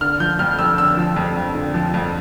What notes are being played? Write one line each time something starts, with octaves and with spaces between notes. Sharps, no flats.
D3 F6
F3 G6
F2 F6
F2 E6
D3 E6
F3
F2
F2
D3
F3
F2